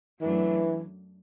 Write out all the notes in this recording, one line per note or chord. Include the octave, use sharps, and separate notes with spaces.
F#2 E3 F#3 A3 D4